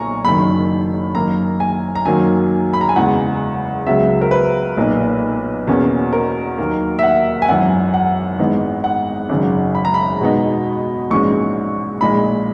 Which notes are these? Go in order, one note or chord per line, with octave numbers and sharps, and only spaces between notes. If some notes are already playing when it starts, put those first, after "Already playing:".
Already playing: B1 A#2 A#3 G#5 A#5 C#6
F#1 F#2 D#3 B5
F#2 D#3 A#3 A#5
G#5
A#5
F#2 D#3 F#3 A#3 G#5
B5
A#5
G#5
E2 C#3 E3 G#3 F#5
C#2 C#3 F#3 B3 E5
A#4
B4
B1 A#2 A#3 D#4
E2 B2 A#3 C#4
A#4
D#2 D#3 F#3 A#3
E5
F#5
G#5
G#1 F#2 E3 F#5
F#5
G#1 G#2 E3 B3 D#4
F#5
G#1 F#2 C#3
B5
A#5
B5
E2 B2 G#3 B3 D#4
A#1 G#2 E3 G#3 C#4 C#6
A#1 A#2 G#3 D#4 B5